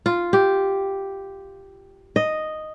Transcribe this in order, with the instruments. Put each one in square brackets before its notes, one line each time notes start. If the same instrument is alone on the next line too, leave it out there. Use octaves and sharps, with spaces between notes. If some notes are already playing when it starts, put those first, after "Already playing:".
[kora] F4
G4
D#5